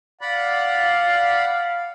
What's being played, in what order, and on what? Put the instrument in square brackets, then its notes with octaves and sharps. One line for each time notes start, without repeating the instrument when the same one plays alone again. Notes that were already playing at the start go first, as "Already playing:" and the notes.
[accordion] D5 F#5 B5 [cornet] F5